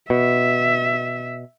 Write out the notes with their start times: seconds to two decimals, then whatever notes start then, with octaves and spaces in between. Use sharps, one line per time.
0.10 B2 E5